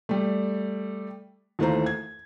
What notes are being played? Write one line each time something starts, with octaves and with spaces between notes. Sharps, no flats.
G3 A3
D#2 E3 A3 F4 C5 A#5
G#6